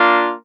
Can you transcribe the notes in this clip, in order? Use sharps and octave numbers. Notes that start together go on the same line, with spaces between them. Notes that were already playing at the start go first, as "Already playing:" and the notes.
Already playing: A#3 D4 F4